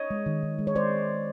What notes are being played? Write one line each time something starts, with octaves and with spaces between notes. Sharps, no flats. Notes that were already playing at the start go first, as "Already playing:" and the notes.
Already playing: C#5 D#5
G#3
D#3
D#3
G#3
C#5
G#3 C5 D5